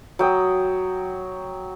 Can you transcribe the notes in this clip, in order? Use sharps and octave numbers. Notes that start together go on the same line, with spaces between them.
F#3 G5 D#6